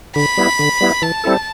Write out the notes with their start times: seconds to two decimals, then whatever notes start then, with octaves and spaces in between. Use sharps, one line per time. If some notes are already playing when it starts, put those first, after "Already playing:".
0.16 D3 B5
0.37 G3 B3 E4
0.59 D3
0.81 G3 B3 E4
1.02 E3 A5
1.24 G3 C4 E4 A4